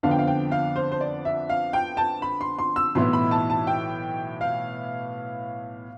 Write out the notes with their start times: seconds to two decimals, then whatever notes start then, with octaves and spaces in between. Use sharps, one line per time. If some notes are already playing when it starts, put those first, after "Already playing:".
0.03 F2 D3 F3 B3 D4 F5
0.11 G5
0.19 F5
0.27 G5
0.52 F5
0.76 C5
0.92 C5
1.01 D5
1.25 E5
1.49 F5
1.73 G5
1.97 A5
2.22 B5
2.41 C6
2.59 C6
2.76 E6
2.95 B1 A2 E3 B3 E4 C6
3.13 B5
3.31 A5
3.50 A5
3.67 G5
4.41 F5